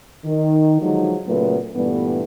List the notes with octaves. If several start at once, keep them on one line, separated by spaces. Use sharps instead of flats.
D#3
D3 F3 F#3 G#3 D#4
A#2 C#3 F#3 A3 B3
G2 A#2 E3 G3 A3 B3